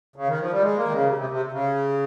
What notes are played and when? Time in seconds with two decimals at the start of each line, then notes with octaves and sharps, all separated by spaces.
0.16 C#3
0.27 D#3
0.40 F3
0.51 G3
0.62 G#3
0.77 A#3
0.86 D#3
0.92 C#3
1.07 C3
1.18 C3
1.30 C3
1.52 C#3